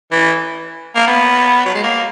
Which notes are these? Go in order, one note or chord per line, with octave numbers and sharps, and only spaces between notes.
E3
A#3
B3
F#3
G#3
A#3